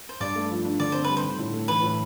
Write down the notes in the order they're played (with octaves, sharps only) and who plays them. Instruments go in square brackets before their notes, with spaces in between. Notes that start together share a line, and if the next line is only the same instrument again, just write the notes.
[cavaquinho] C5
[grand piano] G2 [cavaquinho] D5
[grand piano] A3
F3
D4
[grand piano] D3 [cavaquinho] D5
[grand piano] C4 [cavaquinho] C5
[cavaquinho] B4
[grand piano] G3
[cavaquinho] C5
[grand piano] D3
A2
A3
[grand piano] E3 [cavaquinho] B4
[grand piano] A2